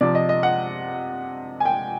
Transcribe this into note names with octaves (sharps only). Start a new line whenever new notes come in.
C3 F3 D5
D#5
D#5
F#5
G#5
G5